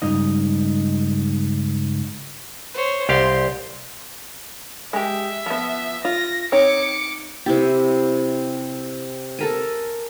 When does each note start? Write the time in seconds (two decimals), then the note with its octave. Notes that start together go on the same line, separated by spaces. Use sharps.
0.02 C#2 G2 D#4 D#5
2.74 C5 C#5
3.09 C2 G4 F5 C6
4.93 G#3 G4 E5
5.46 F3 B3
6.05 F4 A#6
6.52 C4 D#4 C#5 D6 C#7
7.46 C3 E4 G4
9.39 A4 A#4 G#5